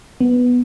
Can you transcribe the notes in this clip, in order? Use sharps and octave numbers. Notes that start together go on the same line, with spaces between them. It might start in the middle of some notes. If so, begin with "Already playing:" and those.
B3